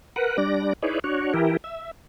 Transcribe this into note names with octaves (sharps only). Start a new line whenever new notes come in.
A#4 B4 F#5
G3 D4 D5 A#6
D#4 E4 G#4 B4 C#5 D5
D4 F#4 C#5
E3 E4 G4 A#4
E5